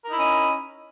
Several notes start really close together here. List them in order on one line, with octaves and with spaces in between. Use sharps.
A#4 D#4 E4 C#4 D#5